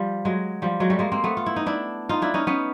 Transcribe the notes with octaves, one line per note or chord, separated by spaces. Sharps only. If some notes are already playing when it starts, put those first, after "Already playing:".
Already playing: F3 G3
F#3 G#3
F3 G3
F#3 G#3
G3 A3
G#3 A#3
A#3 C4
A3 B3
F4
E4
D#4
D4 E4
D#4 F4
D4 E4
C#4 D#4
B3 C#4